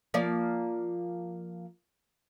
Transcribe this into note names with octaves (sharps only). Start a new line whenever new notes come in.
F3 A#3 D5